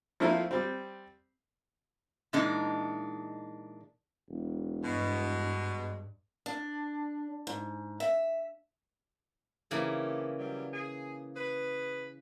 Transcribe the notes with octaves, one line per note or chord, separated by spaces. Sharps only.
F3 A3 A#3 C4 E4 F4
G3 C4
A#2 E3 G#3 D4 D#4
E1
G2 B2 G#3
D4
G#2
E5
C#3 E3 A#3 C4 G4 A4
F#3 G3
G#4
G#4 B4